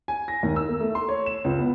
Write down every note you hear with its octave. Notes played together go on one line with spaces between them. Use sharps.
G#5
A#6
D#2
E6
A#3
A3
C6
C#5
E7
C#2
B3